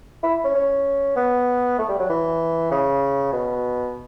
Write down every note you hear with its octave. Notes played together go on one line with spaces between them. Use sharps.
E4
C#4
C#4
B3
A3
G3
F#3
E3
C#3
B2